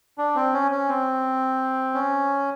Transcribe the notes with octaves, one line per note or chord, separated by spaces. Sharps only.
D4
C4
C#4
C#4
C4
C#4